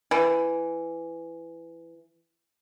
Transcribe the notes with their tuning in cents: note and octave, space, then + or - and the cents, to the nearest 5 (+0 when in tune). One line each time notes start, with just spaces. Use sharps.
E3 +15